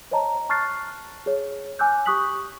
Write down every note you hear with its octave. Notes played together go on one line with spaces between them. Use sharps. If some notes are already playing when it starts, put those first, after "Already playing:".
C5 C#5 D#5 A5 A#5
A5 C#6 F6 F#6 A6 C7
G#4 C#5
G#5 D6 E6 F#6 G6
G4 C#6 D#6 F#6 B6 F#7